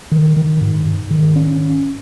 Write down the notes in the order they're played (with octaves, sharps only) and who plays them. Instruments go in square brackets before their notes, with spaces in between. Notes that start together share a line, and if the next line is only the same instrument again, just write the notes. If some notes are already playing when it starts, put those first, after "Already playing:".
[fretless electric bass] D#3
D#3
G#2
G#2
D#3
C#4